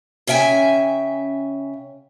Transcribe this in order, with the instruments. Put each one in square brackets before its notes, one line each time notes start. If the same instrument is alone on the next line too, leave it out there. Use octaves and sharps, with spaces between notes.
[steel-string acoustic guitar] C#3 C#4 E5 G5 G#5